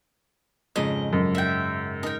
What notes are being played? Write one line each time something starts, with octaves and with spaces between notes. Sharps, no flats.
F2 G#2 C#3 D#5
F#2
E5 F#5 G5
D#4 A#4 G5